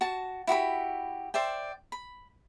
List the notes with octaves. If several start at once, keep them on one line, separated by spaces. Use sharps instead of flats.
F#4 A5
E4 F#4 G4 B5
C5 D5 E5 G5
B5